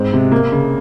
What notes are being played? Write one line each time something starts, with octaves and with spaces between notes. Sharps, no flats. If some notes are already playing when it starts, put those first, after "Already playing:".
Already playing: G#2 C4
C3
A#3
C#3